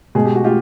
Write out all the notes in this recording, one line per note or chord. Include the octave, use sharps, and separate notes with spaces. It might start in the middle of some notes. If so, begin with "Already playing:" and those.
B2 G#3 G#4
G4
F#4
F4 G4